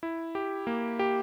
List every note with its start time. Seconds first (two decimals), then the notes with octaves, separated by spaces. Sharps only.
0.03 E4
0.35 G4
0.67 A#3
0.99 G4